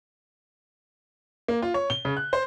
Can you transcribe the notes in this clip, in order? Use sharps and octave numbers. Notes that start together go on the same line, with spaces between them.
A#3
F4
C#5
G7
C#3
F#6
C5